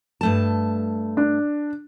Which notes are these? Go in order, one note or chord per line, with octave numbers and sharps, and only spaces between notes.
G2 A3 A5
D4